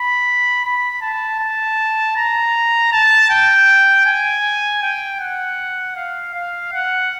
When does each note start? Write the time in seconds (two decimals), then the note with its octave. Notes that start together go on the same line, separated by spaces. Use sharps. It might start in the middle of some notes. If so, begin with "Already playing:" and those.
Already playing: B5
0.65 B5
1.01 A5
1.40 A5
2.17 A#5
2.93 A5
3.30 G5
4.06 G#5
4.83 G5
5.20 F#5
5.96 F5
6.34 F5
6.73 F#5